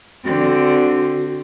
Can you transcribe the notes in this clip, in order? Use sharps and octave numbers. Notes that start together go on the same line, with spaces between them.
D3 C4 F#4